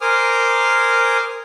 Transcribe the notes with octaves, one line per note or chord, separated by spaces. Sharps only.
A#4 C5 G#5 D6 D#6 F6